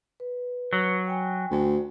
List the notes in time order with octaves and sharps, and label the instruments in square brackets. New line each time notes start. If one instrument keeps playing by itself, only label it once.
[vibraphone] B4
[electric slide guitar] F#3
[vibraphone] G5 G#5
[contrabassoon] D2